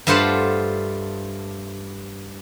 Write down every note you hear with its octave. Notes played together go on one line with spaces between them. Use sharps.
G2 A3 F4 C5 F#5 A5